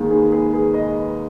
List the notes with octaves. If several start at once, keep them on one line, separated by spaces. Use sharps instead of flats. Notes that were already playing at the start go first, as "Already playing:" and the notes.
Already playing: D#2 D#3 G#3
G#4 B4
G#4 B4
G#4 B4
B4 D#5